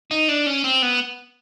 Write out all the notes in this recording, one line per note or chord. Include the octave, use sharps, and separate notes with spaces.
D#4
D4
C#4
C4
B3